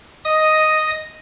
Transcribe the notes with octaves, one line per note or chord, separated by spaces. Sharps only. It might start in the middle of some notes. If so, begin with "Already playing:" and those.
D#5 D#6